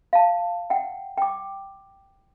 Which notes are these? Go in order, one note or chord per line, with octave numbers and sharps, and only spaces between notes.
F5 A5
F#5 G5
G5 D6